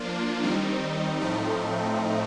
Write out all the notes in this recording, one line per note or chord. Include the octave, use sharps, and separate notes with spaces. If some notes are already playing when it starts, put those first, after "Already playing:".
Already playing: F3 A#3 D4 F4
D#3 G3 C4 D#4
A2 F3 A3 C4 D#4